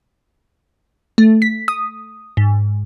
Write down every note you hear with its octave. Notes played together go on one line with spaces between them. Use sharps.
A3
B6
D#6
G#2